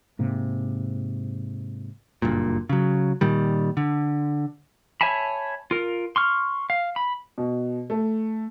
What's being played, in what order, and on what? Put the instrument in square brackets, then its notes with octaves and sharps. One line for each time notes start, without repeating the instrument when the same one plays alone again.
[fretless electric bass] G#2 C3 A#3
[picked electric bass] F#1 G2 A#2
C#3 F#3
A#2 D#3 G3
D3
[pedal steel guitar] C#5 E5 G#5 A5 B5
F4 A#4
C6 C#6 F6
F5
B5
[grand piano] B2
A3